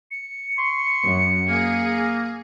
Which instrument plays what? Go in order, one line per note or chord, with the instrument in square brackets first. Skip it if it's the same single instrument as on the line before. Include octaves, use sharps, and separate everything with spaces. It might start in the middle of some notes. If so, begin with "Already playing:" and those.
[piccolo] C#7
[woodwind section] C6 C#6
[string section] F#2
[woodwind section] A#3 [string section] G#4